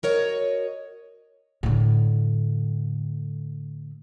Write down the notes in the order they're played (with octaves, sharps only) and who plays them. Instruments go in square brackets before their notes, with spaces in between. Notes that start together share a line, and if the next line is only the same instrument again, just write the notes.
[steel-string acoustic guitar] F#4 A#4 C#5 D#5
[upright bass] A2 D3